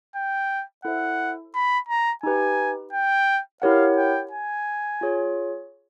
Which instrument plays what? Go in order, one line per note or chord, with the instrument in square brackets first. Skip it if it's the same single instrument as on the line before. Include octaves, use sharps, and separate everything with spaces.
[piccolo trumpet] G5
[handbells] E4 A4 C5 E5 [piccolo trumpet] F#5
[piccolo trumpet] B5
A#5
[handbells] D#4 G4 B4 [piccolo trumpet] G#5
[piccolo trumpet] G5
[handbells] E4 G4 A#4 C#5 F#5 [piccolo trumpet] F5
[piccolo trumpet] G5
G#5
[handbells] F4 G#4 C#5